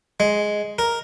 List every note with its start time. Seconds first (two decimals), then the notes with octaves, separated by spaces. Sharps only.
0.20 G#3
0.79 A#4